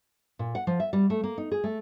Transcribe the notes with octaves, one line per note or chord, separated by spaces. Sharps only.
A#2
F#5
F3
E5
G3
A3
A#3
D#4
G#4
A3